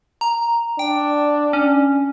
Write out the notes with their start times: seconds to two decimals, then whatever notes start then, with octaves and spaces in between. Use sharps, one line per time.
0.21 A#5
0.79 D4 G5
1.53 C#4